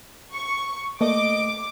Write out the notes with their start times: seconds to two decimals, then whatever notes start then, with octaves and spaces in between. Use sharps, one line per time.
0.33 C#6
1.01 A3 A#3 D5 D#5 D6